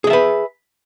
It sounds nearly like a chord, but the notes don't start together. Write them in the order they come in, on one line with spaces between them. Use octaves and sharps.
G#4 D#5 E5 B4